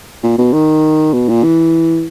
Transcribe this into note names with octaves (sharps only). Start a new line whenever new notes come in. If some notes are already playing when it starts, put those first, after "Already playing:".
A#2
B2
D#3
B2
A#2
E3